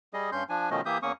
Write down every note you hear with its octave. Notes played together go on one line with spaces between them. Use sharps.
G3 G#4 D#5
G2 C#4 C6 G6
F3 D4 G#5
B2 D#3 F3 A3 C#4 D#5
E3 A#3 G4 E5 D#6 G6
E2 A#3 C#4 C#6 D#6